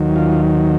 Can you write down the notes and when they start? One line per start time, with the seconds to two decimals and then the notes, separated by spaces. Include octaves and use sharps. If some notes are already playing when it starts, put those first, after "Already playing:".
Already playing: D#2 D#3 F#3
0.16 F4